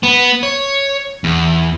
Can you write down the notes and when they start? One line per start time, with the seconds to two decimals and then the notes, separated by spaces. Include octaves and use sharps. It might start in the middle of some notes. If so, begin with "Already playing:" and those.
0.03 B3
0.43 C#5
1.24 E2